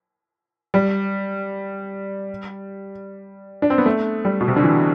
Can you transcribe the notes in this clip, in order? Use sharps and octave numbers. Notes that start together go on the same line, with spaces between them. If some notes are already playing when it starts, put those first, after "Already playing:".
G3
D4
C4
B3
A3
G3
B2
C3
D3
E3